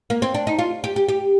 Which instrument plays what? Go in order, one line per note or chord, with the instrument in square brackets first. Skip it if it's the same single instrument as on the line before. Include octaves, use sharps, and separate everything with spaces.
[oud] A#3
C4
D4
D#4
F4
G4
G4
G4